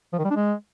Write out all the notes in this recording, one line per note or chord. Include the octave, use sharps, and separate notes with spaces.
F3
D#3
G3
D4
G#3